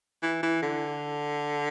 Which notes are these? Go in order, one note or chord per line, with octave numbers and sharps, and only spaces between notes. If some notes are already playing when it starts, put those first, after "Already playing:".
E3
E3
D3